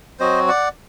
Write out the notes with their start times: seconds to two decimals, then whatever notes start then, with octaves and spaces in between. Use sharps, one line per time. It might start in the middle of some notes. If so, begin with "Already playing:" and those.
0.20 F#3 C4 F#4 C5 D#5
0.48 D5 F#5